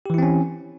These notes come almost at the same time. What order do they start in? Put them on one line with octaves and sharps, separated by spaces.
G4 E3 E4 C4 C#4